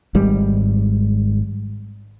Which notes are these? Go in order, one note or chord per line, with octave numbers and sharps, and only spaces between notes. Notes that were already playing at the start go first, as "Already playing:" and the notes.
G#1 G#2 G3